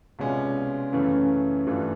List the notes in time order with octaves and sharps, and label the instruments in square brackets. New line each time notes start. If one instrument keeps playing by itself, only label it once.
[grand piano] C2 B2 G#3 C#4 F4
F#2 C#3 E3 A3 C#4
G2 E3 A3 D4 F4